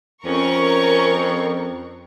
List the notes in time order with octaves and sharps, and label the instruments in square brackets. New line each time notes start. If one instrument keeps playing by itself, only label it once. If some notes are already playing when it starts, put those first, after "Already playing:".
[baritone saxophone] F2 [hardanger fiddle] C#4 [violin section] A#4 C#6